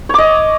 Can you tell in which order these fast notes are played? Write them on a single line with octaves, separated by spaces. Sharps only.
C#5 D6 D#5